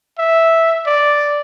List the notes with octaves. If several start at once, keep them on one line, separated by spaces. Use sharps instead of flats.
E5
D5